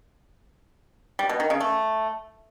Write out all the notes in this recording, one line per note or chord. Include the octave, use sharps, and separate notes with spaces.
G3
B2
D#3
C#3
A3